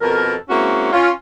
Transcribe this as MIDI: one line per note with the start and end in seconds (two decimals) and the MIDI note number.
0.01 0.34 41
0.01 0.34 47
0.01 0.34 69
0.01 0.34 70
0.50 0.90 56
0.50 0.90 58
0.50 0.90 60
0.50 0.90 61
0.50 0.90 64
0.50 0.90 66
0.93 1.10 61
0.93 1.10 65